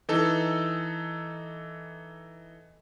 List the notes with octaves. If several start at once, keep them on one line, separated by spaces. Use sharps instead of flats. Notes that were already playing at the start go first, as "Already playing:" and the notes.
E3 D#4 A4